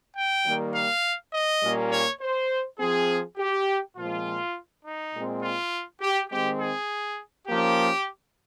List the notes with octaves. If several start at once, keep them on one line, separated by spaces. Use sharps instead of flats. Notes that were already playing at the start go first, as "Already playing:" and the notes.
G5
D#3 G3 A#3
F5
D#5
A#2 G3 A#3 C#4
C#5
C5
F3 C4 G#4
G4
A#2 F3 G#3 C4 F4
D#4
A#2 G#3 C4
F4
G4
D#3 G#3 C4 G4
G#4
F3 A#3 C#4 G4